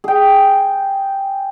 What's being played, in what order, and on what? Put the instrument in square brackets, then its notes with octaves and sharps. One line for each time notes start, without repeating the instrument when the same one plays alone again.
[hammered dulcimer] G#4 G5